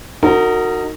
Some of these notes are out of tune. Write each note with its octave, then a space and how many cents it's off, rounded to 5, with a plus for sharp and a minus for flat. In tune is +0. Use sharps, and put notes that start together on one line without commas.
D#4 +0 F#4 +0 A#4 -35